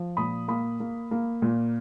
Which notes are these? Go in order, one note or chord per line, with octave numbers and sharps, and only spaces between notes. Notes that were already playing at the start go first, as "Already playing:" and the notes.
Already playing: F3
A#2 B5 D#6
A#3 B5 D#6
A#3
A#3
A#2